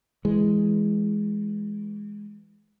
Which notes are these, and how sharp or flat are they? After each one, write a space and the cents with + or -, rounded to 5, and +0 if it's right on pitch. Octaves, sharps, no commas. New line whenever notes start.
E3 +0 G#3 +0